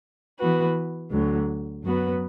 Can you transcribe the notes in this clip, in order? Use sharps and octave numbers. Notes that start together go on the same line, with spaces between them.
E3 B3 F#4 B4
D2 D3 F#3
F#2 F#3 B3 F#4 B4